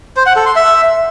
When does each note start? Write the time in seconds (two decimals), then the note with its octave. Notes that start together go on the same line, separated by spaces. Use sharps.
0.16 C5
0.26 F#5
0.36 A4
0.46 C6
0.56 E5